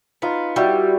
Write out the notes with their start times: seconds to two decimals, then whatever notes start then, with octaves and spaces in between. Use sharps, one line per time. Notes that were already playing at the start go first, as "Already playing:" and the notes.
0.22 B3 D#4 F4
0.56 G3 E4 F#4